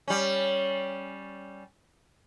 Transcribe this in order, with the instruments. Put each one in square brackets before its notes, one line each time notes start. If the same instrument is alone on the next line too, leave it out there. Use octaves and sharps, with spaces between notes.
[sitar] G3 C#4